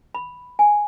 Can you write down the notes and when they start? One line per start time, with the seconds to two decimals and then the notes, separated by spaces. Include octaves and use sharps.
0.15 B5
0.59 G#5